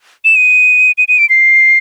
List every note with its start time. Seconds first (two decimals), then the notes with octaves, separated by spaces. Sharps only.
0.25 E7
0.36 D#7
0.98 D#7
1.08 D#7
1.19 D7
1.29 C7